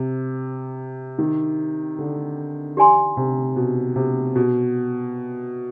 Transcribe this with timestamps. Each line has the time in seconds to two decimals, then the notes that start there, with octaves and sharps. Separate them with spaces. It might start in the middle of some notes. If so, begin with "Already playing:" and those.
Already playing: C3
1.19 D#3
1.99 D3
2.77 G4 D5 G#5 C6
3.17 C3
3.56 B2
3.96 C3
4.36 B2